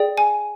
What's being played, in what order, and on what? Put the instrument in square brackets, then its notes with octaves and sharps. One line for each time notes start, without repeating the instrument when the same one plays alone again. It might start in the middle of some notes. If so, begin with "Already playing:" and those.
Already playing: [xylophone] G#4 D5 G5
G#5